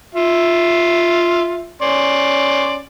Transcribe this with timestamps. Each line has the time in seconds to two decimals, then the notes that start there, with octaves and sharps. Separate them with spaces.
0.15 F4 E5
1.82 C#4 D5 C6